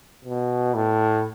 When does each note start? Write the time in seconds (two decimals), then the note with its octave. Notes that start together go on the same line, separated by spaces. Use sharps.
0.25 B2
0.74 A2